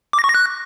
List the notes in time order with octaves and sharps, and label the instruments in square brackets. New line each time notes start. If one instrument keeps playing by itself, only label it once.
[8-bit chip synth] D6
A#6
C#6
A#6
F#6